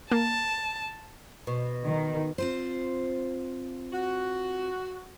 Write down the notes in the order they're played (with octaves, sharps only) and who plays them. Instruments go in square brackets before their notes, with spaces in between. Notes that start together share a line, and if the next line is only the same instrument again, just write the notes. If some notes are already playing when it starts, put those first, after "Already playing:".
[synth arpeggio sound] A#3 [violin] A5
[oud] B2
[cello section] D#3
[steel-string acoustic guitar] C4 F4 C5
[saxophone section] F#4